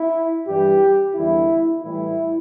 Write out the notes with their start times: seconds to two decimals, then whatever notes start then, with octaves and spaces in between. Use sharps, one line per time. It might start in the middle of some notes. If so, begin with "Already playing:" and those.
Already playing: E4
0.47 G2 E3 G3 G4
1.15 E2 D3 G3 E4
1.82 A2 E3 G3 E4